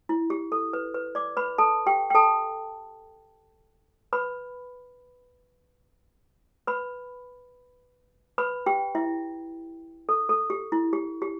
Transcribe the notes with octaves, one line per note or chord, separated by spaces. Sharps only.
E4
G4
A4
B4
B4
D5 D6
B4 B5
A4 A5
G4 G5
G5
A4 A5
B4 B5
B4 B5
B4 B5
G4 G5
E4 E5
A4
A4
G4
E4
G4
G4